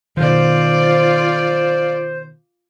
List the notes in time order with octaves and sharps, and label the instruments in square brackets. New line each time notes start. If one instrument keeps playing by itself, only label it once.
[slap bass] B2 D#3 [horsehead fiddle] F4 D5 [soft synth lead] C5